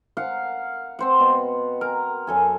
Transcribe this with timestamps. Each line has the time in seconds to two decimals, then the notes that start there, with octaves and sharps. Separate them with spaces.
0.17 A#4 F5 F#5
0.99 C4 C5 F#5
1.20 B2
1.81 A#4
2.27 F#2 A4 G#5